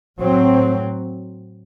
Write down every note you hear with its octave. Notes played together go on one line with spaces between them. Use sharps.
A2 F#3 C4